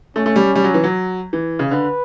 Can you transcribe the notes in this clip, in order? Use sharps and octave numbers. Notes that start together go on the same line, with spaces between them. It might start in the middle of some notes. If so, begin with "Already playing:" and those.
A3 C#4
A3
G3
G3
F#3
E3
F#3
E3
C#3
D3 B4